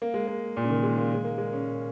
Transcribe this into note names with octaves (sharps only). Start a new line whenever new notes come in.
A#3
G#3
A#3
A#2
C#3
D#3
G#3
A#3
G#3
A#3
G#3
C#4